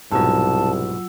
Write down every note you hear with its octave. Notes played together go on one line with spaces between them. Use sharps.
C2 G#2 B2 F#3 F4 A5 E6